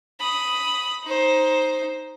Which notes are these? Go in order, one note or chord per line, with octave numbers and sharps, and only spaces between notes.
B5 D#6
D#4 C5